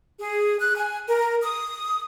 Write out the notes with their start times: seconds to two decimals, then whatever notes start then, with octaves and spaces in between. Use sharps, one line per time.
0.19 G#4
0.61 F#6
0.77 G#5
1.08 A#4
1.40 D#6